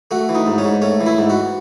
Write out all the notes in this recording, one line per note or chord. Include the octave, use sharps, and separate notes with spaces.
A3 F#4
E3
D#4
G#2
C#4
G#2
A3 C#4
E3
E4
G#2
F#4